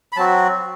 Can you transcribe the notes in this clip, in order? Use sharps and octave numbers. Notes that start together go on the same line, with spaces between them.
B5
F#3 C4 F#4 A5